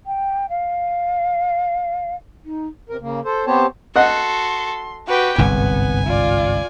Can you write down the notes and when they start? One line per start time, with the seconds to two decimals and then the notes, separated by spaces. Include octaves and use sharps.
0.06 G5
0.49 F5
2.45 D#4
2.89 C3 A#4
3.01 C#3 A#3
3.25 A4 C5
3.46 B3 C4 G4 C5 C#5 A5
3.96 F#4 A4 D#5 F#5 C6
5.07 F#4 G4 B4 G5
5.38 G1 C2 G#2 B3 G#5
6.06 F4 D5